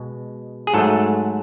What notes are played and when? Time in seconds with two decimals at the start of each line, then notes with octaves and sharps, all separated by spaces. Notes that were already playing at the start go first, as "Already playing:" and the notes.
Already playing: B2 G#3
0.67 G#4
0.74 G#2 F#3 A3 A4